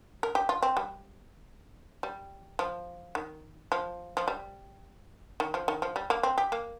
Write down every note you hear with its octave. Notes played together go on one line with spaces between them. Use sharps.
A#4
G4
F4
C4
G3
G3
F3
D#3
F3
F3
G3
D#3
F3
D#3
F3
G3
A#3
C4
G4
A#3